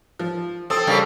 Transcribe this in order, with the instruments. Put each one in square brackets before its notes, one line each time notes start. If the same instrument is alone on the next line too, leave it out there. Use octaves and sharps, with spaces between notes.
[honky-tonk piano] F3
[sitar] C4 [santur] A4 [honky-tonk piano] A5 D#6
[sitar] C#3 G3 A#3